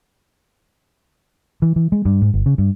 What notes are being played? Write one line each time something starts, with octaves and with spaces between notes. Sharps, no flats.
E3
E3
G#3
G2
G#2
G1
C#3
G2